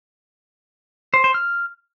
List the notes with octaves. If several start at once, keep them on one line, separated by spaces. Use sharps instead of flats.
C5
C5
F6